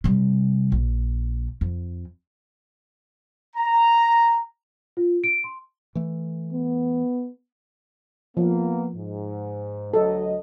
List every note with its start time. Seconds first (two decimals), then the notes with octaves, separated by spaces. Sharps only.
0.04 C3 G3
0.72 A#1
1.61 F2
3.56 A#5
4.97 F4
5.24 D7
5.44 C6
5.95 E3 A3
6.53 B3
8.37 F3 A#3 B3
8.95 G#2
9.94 D2 F#3 A4 D#5